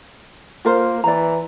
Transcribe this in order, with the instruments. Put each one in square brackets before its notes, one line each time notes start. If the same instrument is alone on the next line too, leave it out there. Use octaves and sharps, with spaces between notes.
[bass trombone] A#3 [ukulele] F4 A#4 C5
[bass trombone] E3 [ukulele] D5 A#5